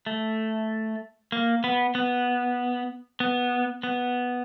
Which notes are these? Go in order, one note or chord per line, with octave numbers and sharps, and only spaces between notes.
A3
A#3
B3
B3
B3
B3